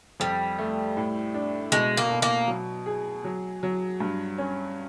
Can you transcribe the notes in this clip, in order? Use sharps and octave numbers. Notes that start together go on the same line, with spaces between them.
F2 G3
A3
A2
D4
B2 G#3
A#3
B2
A#3
F#3
G#4
F#3
F#3
G2
C#4